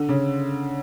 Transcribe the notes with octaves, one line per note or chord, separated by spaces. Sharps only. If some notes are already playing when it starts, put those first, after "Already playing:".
Already playing: D3
C#3